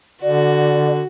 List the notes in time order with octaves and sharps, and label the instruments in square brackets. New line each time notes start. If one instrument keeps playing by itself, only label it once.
[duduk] D3 [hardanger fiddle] F#4 [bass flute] D5